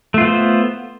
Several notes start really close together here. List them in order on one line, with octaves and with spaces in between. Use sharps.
A3 F4 B3 C5